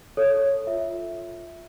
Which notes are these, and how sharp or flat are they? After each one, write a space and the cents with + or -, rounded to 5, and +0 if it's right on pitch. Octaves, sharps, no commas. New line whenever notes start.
A4 +0 C#5 +0
F4 +0 E5 +0